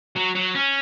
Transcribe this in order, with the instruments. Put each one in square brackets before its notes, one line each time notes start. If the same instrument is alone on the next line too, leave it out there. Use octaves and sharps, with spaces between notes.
[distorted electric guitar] F#3
F#3
C#4